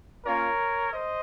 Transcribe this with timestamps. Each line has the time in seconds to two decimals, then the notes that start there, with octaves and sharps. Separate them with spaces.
0.25 A#3 C#4 F4 A#4 C#5
0.92 C5 D#5